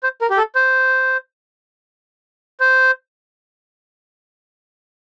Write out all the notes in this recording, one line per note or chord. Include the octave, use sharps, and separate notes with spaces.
C5
A#4
G4
A4
C5
C5